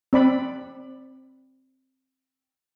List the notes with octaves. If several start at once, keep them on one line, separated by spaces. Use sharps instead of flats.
C4 D5 B5